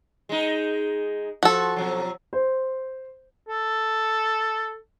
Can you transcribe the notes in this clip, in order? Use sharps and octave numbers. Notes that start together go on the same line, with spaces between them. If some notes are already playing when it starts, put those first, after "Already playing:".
G#3 D#4
F3 F#4 A4
B2 F3 F#3
C5
A4